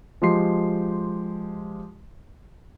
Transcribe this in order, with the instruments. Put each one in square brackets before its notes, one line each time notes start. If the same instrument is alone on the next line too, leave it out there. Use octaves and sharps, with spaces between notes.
[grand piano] F3 G#3 G4 C6 C7